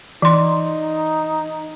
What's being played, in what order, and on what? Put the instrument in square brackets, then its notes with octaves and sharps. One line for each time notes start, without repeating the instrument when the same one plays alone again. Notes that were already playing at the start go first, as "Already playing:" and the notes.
[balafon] E3 C6 [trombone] D#4